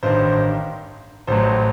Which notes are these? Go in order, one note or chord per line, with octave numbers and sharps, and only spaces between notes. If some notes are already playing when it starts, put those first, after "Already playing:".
A1 G2 D#3 C5
A1 A2 F#3 C5